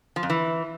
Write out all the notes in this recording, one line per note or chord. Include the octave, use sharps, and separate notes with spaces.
F3
F2
E3